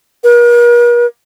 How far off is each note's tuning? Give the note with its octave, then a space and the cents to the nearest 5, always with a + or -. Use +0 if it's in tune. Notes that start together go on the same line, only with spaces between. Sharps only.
A#4 +45